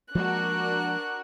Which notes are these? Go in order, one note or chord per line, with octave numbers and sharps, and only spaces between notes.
F3 G#3 A#3 D4 F#4 A#4 F#6